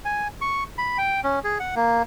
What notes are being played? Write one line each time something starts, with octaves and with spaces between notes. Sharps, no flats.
G#5
C#6
B5
G5
C#4
G#4
F#5
A#3